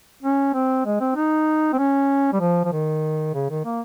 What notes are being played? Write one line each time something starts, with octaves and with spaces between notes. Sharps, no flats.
C#4
C4
G#3
C4
D#4
C4
C#4
G3
F3
F3
D#3
C#3
D#3
A#3